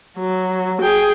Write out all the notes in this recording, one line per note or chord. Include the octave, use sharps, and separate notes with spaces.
F#3
G#4 G5